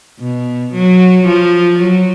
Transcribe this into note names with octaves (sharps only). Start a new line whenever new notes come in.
B2
F#3
F3
F#3